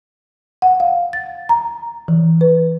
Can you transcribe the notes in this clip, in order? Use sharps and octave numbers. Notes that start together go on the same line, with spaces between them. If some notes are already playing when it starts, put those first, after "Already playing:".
F#5
F5
A6
A#5
E3
B4